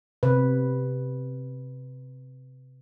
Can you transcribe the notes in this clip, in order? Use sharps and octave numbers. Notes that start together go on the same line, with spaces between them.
C3 B4